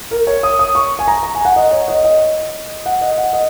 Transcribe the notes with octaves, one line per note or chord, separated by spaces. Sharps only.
A#4
C#5
D#6
D#6
C#6
G#5
A#5
A#5
G#5
F#5
D#5
C#5
D#5
D#5
F#5
D#5
F#5
D#5